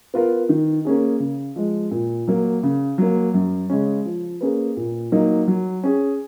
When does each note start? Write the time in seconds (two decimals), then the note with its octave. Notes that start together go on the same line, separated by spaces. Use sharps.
0.14 B3 F4 A#4
0.49 D#3
0.85 A#3 C#4 G#4
1.20 C#3
1.56 F3 G#3
1.91 A#2
2.28 F#3 A#3
2.63 C#3
2.98 F#3 A#3
3.34 F#2
3.70 C#3 G#3 C#4
4.05 F3
4.41 A#3 C#4 G#4 B4
4.77 A#2
5.12 F#3 A#3 D#4
5.48 F#3
5.83 C#4 G#4